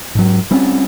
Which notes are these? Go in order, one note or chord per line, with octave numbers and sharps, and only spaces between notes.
G#2 F#3
G3 C4 C#4